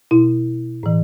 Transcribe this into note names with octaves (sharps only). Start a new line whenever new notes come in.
B2 E4
A2 E3